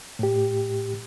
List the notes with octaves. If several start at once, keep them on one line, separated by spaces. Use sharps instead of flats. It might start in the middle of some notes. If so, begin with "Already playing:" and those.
A2 G4